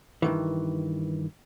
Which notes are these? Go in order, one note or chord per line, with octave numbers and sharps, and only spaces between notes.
G2 D#3 E3